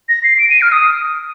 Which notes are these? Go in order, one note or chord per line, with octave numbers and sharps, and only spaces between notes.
A#6
C7
D7
D#7
F6
D#6